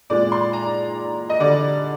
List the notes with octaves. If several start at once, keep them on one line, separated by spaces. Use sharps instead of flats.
A#2 G#3 D5
C6
A#5
D#5
D3 G3 D5